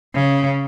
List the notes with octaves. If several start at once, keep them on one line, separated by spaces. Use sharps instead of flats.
C#3